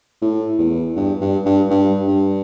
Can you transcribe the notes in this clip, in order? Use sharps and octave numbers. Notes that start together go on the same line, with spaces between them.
A2
E2
G2
G2
G2
G2
G2